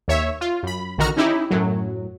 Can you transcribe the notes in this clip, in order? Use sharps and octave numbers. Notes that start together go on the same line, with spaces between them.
D#2 C#5 E5
F4
F#2 B5
A#1 D3 D#3 F#4 A#5 F6
C#4 D#4 E4 G4
F#2 A2 F#3